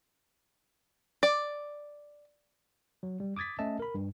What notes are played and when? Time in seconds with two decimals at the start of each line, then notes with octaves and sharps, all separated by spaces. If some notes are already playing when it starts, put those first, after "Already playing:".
1.23 D5
3.03 F#3
3.20 G3
3.37 D6 D#6 G#6 A6 B6
3.59 A3 C#4 D#5 E5 A5
3.80 A#4 B5
3.95 G2